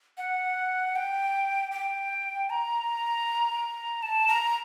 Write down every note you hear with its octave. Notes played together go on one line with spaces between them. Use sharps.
F#5
G5
G5
A#5
A5
A#5